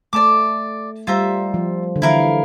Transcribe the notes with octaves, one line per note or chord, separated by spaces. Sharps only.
A3 D5 A5 D6
G3 F4 C5 E5 A#5
F3
D3
E3 E4 A#4 F5